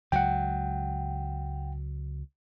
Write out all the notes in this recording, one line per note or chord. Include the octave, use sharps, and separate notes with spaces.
C#2 F#3 F#5 G5